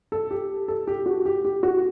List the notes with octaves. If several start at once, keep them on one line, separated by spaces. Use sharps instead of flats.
A4
G4
A4
G4
F#4
G4
G4
F#4